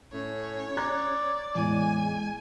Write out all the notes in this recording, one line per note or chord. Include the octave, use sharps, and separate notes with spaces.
A2 C#4 C#5
D5 A#5 F#6 G#6
E2 A2 G#3 G#5